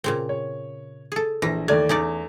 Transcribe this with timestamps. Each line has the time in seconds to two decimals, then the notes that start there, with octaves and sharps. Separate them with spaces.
0.04 A#2 C#3 C4
0.29 C#5
1.12 G#4 A4
1.42 A#1 E3 A#6
1.68 D#2 A3 D5 G#6
1.89 E2 C#4 D#4 D5